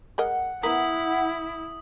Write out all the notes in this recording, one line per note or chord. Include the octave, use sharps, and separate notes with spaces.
G#3 A#4 D#5 F#5
B3 E4 A#4 D#6 B6 F#7